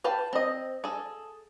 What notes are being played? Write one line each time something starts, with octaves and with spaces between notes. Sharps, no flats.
B4 F5 G5 A5
C4 D#5
G#4 A4